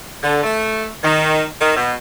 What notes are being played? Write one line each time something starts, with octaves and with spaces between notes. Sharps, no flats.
D3
A3
D#3
D#3
B2